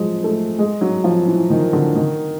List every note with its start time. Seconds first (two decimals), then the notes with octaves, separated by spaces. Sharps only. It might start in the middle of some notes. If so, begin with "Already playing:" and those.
Already playing: F3 F#3 G#3
0.24 A3
0.59 G#3
0.81 F#3
1.04 F3
1.27 E3
1.50 D#3
1.73 D3
1.95 D#3